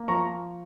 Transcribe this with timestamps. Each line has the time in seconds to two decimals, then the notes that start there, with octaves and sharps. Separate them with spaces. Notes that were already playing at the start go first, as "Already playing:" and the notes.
Already playing: A#3
0.08 F3 A#5 C#6